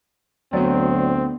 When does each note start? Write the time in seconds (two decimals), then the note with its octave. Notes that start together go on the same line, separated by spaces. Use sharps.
0.53 D2 F#3 B3 C4 D5